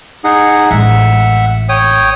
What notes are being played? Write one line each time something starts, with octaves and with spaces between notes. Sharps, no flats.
D#4 G#4 F#5
A1 G#3 E5 F#5
C#5 G5 D#6